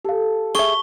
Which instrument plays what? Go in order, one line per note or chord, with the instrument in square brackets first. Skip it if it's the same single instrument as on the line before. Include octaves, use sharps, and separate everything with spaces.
[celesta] G4 F5 [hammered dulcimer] A4
[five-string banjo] G#4 E5 [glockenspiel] C#6 G7